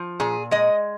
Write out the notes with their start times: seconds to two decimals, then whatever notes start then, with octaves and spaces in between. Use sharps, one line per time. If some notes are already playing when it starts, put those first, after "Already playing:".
Already playing: F3
0.20 A#2 G#4
0.51 G#3 D#5